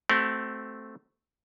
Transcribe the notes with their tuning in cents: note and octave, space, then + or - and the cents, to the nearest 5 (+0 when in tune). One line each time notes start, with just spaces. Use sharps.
A3 +0 C4 +0 F#4 +45